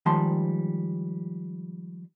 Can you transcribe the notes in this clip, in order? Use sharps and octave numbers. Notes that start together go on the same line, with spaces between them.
D#3 F3 G3 G#3 A5 C6